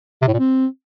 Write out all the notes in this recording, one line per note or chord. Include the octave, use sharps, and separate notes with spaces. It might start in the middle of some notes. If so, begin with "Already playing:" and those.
C3
A2
A#2
C4